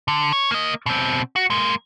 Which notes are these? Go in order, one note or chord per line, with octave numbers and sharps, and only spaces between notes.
D3
C#5
A#3 D#5
B2 C4
F#4
G#3 A#3